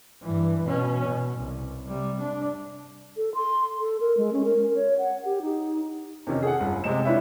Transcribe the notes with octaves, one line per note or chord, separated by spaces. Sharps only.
G2 E3
B2 C#4
B2
C2
C3 G3
D4
A4
C6
A4
A#4
G#3
C#4
A#4
C#5
F#5
G4
D#4
C3 D#3 C#4 D#4
G#4 A4 F#5
G1
C3 G#3 E7
D4 E4 F4 B4 C#5 E5